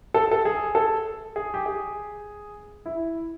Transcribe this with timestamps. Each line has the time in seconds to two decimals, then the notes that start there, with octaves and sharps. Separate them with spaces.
0.14 A4
0.31 A4
0.45 G#4
0.75 A4
1.36 G#4
1.54 G4
1.66 G#4
2.86 E4